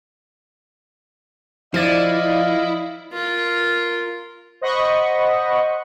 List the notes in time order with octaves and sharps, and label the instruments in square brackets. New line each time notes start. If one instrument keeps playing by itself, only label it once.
[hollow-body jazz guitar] F3 [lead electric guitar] E4 [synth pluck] D5 A6 D#7 [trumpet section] D#5 F5
[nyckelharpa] F4 A#4
[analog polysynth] C5 D#5 F#5 B5 C#6